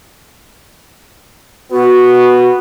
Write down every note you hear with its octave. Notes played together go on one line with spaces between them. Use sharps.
B3 F#4